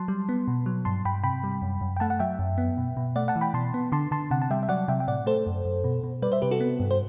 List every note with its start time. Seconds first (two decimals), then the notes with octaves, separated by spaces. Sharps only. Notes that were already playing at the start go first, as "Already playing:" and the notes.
Already playing: F#3 A5 C6
0.08 G3
0.29 B3
0.48 B2
0.66 F#3
0.85 G2 A5 C6
1.05 G2 G5 B5
1.24 C3 G5 B5
1.44 G3
1.62 F#2
1.81 F#2
1.96 G5
2.00 A3 F#5 A5
2.10 F#5
2.19 F#3 E5 G5
2.39 F#2
2.58 B3
2.77 B2
2.97 B2
3.16 A3 D5 F#5
3.28 F#5 A5
3.36 E3
3.41 G5 B5
3.54 B2 A5 C6
3.74 B3
3.92 D3 A5 C6
4.11 D3 A5 C6
4.31 C3 F#5 A5
4.42 A5
4.51 G3 E5 G5
4.63 E5
4.69 F#3 D5 F#5
4.88 C3 E5 G5
5.00 G5
5.08 A2 D5 F#5
5.26 A3 A4 C5
5.47 F#2
5.65 F#2
5.84 B2
6.04 B2
6.22 G3 B4 D5
6.32 C5 E5
6.42 C3 G4 B4
6.51 F#4 A4
6.60 B3
6.80 G2
6.91 C5